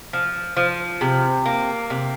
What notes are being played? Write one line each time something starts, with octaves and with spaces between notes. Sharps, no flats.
F3
F3
C3
A#3
C3